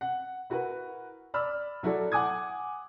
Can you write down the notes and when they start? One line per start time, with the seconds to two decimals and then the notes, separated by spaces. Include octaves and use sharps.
0.01 F#5
0.50 E4 F#4 A#4 B4
1.34 D5 B5 E6 F6
1.83 F#3 E4 F#4 A4 D5
2.12 F#5 G#5 D6 D#6 G#6